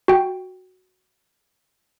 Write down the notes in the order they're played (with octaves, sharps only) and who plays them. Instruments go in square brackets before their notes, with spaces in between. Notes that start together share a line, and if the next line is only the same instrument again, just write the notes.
[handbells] F#4 G5